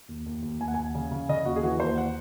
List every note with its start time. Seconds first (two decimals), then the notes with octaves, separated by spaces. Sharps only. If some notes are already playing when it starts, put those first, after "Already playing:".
0.08 D#2
0.26 D#2
0.42 D#2
0.60 D#2 G#5
0.68 F#5
0.74 D#2 G#5
0.95 C#3
1.11 C#3
1.29 C#3 D#5
1.45 D#2 F#4
1.56 G#4
1.63 E3 F#4
1.80 D#2 C5
1.98 F#5